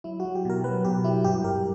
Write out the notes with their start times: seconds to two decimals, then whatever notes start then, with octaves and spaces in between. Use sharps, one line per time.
0.04 F#3 E4
0.20 F#4
0.25 F#3
0.35 G4
0.45 B2 A#4
0.64 F#3 B4
0.85 B2 G4
1.04 F#3 E4
1.24 G2 G4
1.44 G2 A#4